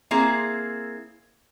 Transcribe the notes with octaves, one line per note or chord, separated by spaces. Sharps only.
A#3 C4 E4 G#4